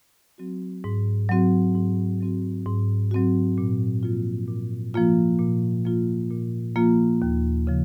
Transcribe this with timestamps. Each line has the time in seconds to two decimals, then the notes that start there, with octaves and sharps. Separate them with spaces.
0.38 F#3 C4 F#4
0.84 G#2
1.29 F#3 C4 F#4
1.75 G#2
2.21 F#3 C4 F#4
2.66 G#2
3.11 F#3 C4 F#4
3.58 A#2
4.03 F3 A#3 F4
4.48 A#2
4.94 F3 A#3 F4
5.39 A#2
5.85 F3 A#3 F4
6.31 A#2
6.76 F3 A#3 F4
7.22 D#2
7.67 C#3 F3